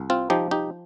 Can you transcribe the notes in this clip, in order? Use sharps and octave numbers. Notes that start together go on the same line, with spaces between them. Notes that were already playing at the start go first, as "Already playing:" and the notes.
Already playing: C2
C4 F4
F3 D#4 G4
D#4 G4